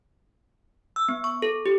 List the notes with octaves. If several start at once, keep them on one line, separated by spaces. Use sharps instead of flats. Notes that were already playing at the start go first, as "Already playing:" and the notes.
E6
B3
C#6
A4
G4